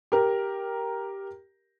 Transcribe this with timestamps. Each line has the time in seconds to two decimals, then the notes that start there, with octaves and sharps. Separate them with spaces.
0.12 G4 A#4